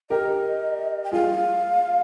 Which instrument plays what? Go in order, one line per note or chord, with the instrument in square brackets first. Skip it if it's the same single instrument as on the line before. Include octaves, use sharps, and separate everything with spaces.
[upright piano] G4 A#4 [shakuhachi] D#5
[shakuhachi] G5
[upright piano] F4 G#4 [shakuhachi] F5